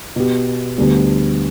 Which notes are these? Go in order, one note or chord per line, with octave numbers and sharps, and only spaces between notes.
B2 B3 G4
D2 D3 G3 B3 D4